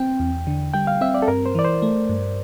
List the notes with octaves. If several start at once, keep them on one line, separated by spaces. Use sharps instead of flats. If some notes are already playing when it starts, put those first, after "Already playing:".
Already playing: C4 G5
E2
D3
G3 G5
F5
C4 E5
D5
A4
G2 A#4
C5
E3 D5
C5
A3
G2